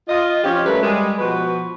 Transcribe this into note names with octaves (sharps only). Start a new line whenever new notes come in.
F4 D#5
F3 C#4 F4 G4
F#3 G3 A3 C#4 A#4 B4
G3 G#3
B2 F3 F#4 B4